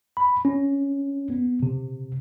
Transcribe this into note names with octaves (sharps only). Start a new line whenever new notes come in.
B5
C#4
B3
C3